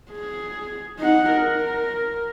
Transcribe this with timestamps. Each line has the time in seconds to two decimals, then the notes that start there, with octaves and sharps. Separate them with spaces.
0.11 G#4
0.99 D#4 F#5
1.30 A#4